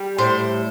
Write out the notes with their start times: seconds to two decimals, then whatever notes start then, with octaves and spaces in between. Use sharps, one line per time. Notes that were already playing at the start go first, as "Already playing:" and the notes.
Already playing: G3
0.18 A2 C5